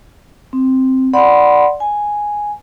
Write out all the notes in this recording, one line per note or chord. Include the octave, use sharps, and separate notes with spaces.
C4
D5 F#5 B5 C6
G#5